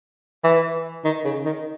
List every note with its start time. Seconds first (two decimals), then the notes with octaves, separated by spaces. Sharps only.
0.44 E3
1.05 D#3
1.25 C#3
1.45 D#3